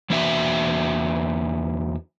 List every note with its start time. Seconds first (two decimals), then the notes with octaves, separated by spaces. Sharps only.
0.10 E2 E3 A#3 D4 F#4 E5